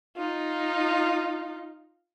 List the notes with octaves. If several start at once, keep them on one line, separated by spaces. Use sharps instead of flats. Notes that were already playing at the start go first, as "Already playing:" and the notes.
D#4 F4